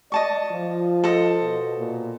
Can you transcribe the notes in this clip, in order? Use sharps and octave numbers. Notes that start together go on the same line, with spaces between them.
D5 D#5 A5 C#6
F3 F4
A4 C5 D#5
B2
A#2